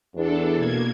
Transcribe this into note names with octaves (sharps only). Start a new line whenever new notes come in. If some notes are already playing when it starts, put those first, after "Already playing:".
E2 D4 A4
B2 A#3 G#6